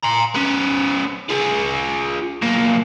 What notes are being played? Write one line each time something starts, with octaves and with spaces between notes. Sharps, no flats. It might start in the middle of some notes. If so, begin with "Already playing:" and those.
A#5 C6
B3 C#4
F4 G#4
B1 A#3